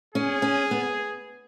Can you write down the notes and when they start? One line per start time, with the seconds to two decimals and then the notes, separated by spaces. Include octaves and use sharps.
0.14 C#4 G#4
0.42 C#4
0.71 B3